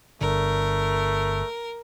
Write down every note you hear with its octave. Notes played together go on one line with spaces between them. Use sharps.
G1 D3 A3 A#4